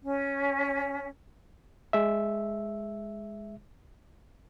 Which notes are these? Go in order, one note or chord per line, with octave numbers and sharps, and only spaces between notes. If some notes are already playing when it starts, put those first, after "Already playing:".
C#4
G#3 E5